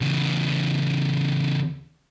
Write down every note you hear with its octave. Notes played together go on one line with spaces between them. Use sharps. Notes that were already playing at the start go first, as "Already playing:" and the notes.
E2 C#3